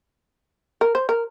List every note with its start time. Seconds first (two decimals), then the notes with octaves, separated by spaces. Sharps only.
0.81 A#4
0.95 C5
1.09 A#4